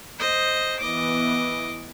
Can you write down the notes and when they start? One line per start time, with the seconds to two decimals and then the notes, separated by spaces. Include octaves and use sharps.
0.19 C5 D#5
0.80 E3 B3 D#5 D6